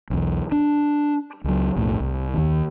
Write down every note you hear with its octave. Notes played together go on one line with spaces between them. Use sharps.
B1 E2
D4
C#2 F#3
B1 F2 A2
C2
D#2 D#3